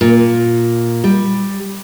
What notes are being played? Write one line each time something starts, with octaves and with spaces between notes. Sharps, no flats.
A#2
G3